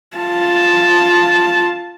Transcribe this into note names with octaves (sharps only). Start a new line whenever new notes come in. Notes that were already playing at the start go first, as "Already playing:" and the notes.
F4 A5